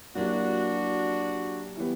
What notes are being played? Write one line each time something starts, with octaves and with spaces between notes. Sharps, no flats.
F#3 A#3 D4 E4 F#4 G4
E3 G3 B3